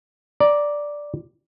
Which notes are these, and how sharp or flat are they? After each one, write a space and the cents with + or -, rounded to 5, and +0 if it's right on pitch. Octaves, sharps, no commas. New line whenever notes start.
D5 +0 A#5 +15